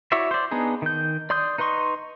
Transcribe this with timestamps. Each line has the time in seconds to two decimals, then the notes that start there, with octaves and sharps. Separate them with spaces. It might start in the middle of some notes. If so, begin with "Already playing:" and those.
0.12 E4 F#4 C#5 D5 E5
0.31 C5 D5
0.51 B3 D4 D#4 G#4
0.82 D#3 G6
1.30 D5 C6 D#6 G6
1.58 D#4 B4 D#5 C6 C#6